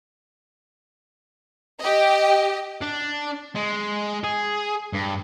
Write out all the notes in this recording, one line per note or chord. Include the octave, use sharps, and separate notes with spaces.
G4 D#5
D4
G#3
G#4
G2